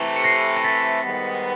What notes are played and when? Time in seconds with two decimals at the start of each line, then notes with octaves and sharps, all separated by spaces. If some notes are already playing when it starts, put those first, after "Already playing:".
Already playing: C3 E3 A3
0.16 C#7
0.24 A#6 C7
0.56 A#6
0.64 A6 B6
1.03 G#2 D#3 G3 B3